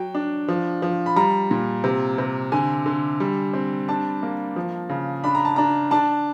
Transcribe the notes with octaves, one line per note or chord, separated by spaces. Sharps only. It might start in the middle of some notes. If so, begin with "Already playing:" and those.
Already playing: F#3 G5
D4
F3
F3
B5
G3 A#5
A#2
C3
C3
D3 G#5
D3
G3
C4
D4 A5
A#3
F3
C#3
D4 B5
A#5
A5
D4 A#5
D4 A5